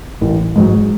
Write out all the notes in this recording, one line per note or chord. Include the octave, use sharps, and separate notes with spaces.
A1
G#2 F#3